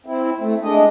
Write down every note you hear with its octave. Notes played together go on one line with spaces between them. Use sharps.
C4 E4
A3
G#3 D4 D#5